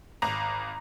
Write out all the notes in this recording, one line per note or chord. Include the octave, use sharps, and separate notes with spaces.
G#1 A#5